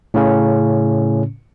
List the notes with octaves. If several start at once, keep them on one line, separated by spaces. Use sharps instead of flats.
A2 C#3 C#4